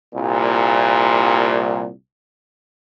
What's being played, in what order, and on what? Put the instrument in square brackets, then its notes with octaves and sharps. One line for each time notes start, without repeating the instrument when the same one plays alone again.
[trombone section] C2 A#2